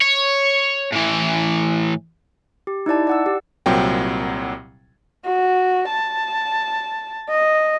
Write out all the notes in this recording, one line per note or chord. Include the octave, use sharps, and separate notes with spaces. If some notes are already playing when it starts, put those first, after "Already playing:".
C#5
A2 E3
G4
D#4 E4 D5 A5
D5 F#5 E6
G4
C2 A#2 F#3 C4 G5
F#4
A5
D#5